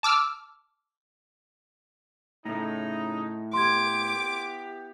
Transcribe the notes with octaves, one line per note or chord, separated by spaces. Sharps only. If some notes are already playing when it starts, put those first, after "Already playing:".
A5 D6 E6 F6
A2 C#3 A3 D#4
B3 E4 G4 C6 D6 G#6